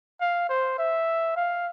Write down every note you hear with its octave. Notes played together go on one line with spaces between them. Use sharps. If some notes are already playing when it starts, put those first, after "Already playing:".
F5
C5
E5
F5